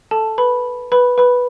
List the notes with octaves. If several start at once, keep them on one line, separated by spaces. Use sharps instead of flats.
A4 A5
B4 B5
B4 B5
B4 B5